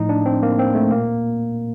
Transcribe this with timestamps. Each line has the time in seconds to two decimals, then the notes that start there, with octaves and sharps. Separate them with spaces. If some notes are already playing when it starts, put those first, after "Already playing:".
Already playing: A2 F3 D#4
0.09 D4
0.26 C4
0.43 A#3
0.59 C4
0.75 A3
0.91 A#2 A#3